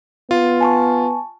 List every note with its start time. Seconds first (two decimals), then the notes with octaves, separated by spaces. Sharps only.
0.31 B3 F4
0.61 G#5 A5 C#6